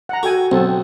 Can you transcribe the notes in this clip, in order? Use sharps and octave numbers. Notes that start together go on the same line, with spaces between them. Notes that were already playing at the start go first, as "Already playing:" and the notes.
F#5 A#5
F#4 A4 G5 G#5
B1 C4 A4 A5